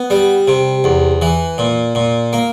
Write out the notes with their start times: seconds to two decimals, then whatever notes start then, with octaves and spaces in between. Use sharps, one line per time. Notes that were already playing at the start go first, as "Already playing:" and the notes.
Already playing: B3
0.10 G3
0.48 C3
0.84 E2
1.22 E3
1.58 A#2
1.95 A#2
2.33 A#3